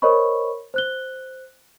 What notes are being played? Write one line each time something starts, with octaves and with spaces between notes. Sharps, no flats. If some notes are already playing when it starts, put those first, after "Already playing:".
A#4 C5 C#5 D#5 B5 C#6
C5 F#6 G7